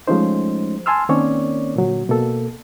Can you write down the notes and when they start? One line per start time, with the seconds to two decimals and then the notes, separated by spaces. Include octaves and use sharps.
0.08 F3 G#3 A3 C#4 D#4 C5
0.86 G#5 A5 C6 E6 F6
1.09 D#3 A#3 C4 C#4 C#5 D5
1.76 A#2 D3 F#3
2.09 B2 A#3 A4